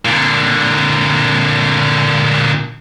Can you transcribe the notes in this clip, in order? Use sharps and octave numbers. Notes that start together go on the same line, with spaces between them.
A#2 D3